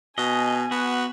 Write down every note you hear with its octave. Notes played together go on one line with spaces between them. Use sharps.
B2 D#5 G#5
B3 F#4